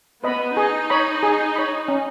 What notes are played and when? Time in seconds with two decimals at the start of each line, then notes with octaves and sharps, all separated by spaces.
0.23 B3 B4 D#5 B5
0.57 D#4 G#4
0.90 C#5 B5
1.23 G#4
1.56 C#5 B5
1.88 C#4